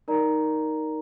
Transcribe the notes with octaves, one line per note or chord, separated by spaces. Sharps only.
D#4 A#4 D5 A#5